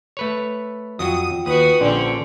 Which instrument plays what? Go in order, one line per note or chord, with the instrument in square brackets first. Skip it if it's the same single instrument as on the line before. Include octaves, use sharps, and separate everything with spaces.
[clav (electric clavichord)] A3 B4 C#5
[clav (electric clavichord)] F2 F#3 F#4 [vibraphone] F4 G5 [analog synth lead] D#6
[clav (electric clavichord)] D#2 [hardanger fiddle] F#4 B4 [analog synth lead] D#6
[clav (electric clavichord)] A#1 [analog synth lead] D3 [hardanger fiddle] C4 C#4